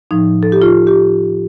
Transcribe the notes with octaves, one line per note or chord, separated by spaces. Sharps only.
A2 F3 D#4
A4
G4
F4
G4